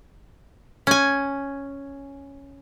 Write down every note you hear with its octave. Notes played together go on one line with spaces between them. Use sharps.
C#4 G#5